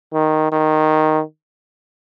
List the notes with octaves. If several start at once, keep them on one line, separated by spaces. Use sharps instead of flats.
D#3
D#3